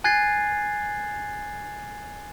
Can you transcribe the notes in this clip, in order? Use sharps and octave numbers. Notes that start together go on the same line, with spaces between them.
G#5 F#6 G#6 A6 C7